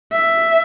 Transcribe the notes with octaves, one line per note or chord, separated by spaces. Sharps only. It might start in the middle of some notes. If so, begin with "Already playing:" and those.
E5